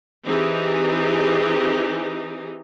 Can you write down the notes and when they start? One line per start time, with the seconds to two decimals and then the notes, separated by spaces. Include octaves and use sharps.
0.26 E3 C4 D#4 G4 G#4